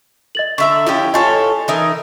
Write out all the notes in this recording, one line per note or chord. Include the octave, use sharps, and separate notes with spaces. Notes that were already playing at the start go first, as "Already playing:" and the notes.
D#5 A6 F#7
D3 E5 A#5 C#6 E6
F3 C#4 E4 G4
F4 A4 C#5 D#5 G#5 C#6
E3 D#4 A#4